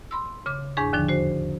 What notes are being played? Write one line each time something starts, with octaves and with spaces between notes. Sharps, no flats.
B5 C6 E6
C#3 D6
E2 G#2 D4 G#4 C#6
D#2 D3 F3 D4
F#4 C5